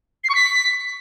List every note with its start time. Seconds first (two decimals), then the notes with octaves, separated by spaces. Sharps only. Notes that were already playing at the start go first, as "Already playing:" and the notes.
0.24 C7
0.29 C#6
0.35 B6